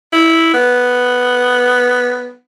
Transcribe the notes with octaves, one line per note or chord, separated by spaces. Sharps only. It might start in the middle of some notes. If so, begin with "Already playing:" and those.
E4
B3